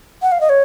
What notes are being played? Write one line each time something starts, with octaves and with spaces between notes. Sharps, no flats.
F#5
F5
D#5
C#5